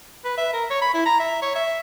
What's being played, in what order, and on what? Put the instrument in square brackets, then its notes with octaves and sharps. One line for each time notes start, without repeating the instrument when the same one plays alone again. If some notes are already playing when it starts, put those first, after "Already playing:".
[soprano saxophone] B4
E5
A#4
C#5
B5
E4
A#5
E5
C#5
E5